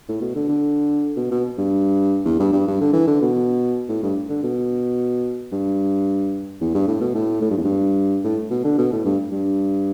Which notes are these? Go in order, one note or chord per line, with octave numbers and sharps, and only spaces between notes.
A2
B2
D3
D3
B2
B2
G2
E2
G2
G2
G2
D3
E3
D3
B2
A2
G2
D3
B2
G2
E2
G2
A2
B2
A2
A2
G2
E2
G2
A2
B2
D3
B2
A2
G2
G2